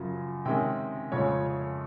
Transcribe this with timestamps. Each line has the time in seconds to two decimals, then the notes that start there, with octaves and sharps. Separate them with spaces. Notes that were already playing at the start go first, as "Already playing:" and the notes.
Already playing: F#2 C#3 F3
0.45 C3 D#3 G#3 C#4 G5
1.12 F2 C#3 F3 G#3 C#5
1.46 C#5